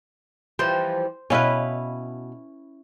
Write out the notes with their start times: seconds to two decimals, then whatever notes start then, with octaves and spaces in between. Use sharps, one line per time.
0.59 E3 F3 G3 C5
1.30 B2 C#4 E4 B4 F5